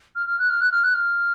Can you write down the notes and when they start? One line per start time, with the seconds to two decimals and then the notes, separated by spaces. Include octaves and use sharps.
0.16 F6
0.27 F6
0.39 F#6
0.50 F6
0.61 F#6
0.72 F6
0.84 F#6
0.94 F6